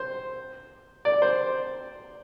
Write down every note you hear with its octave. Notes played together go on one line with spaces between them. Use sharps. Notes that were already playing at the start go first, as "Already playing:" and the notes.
Already playing: C5
D5
C5